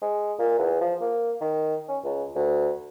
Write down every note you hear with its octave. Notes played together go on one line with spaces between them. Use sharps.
G#3
A#2
E2
F3
A#3
D#3
C#4
C#2
D2